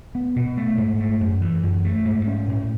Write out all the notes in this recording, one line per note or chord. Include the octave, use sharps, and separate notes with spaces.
B3
B2
A3
G#2
A3
F#2
E3
F#2
A3
G#2
C#4
A2